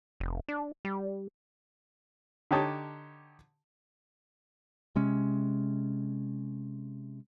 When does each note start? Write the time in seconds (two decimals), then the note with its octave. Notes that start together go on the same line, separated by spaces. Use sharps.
0.20 F1
0.48 D4
0.85 G3
2.51 D3 D#4 G4 C#5 A5 D#6
4.96 C3 G#3 C#4